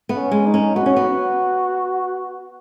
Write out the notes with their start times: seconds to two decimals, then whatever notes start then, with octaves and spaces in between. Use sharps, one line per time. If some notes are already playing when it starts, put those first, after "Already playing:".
0.09 B3
0.16 C#4
0.32 G#3
0.46 D#4
0.54 C#4
0.76 B3 F#4
0.86 C#4
0.96 B3